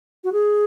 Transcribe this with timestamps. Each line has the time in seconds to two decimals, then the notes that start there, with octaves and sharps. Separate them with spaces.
0.24 F#4
0.33 G#4